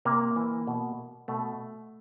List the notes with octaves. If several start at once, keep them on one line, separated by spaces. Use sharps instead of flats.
C3 A#3
E3
B2
B2 A3